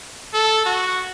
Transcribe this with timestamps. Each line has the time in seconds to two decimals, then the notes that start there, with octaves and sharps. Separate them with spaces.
0.34 A4
0.66 F#4